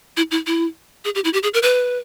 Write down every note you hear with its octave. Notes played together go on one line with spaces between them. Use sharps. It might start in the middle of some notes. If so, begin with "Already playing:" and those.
E4
E4
E4
G#4
G4
E4
G4
G#4
A#4
B4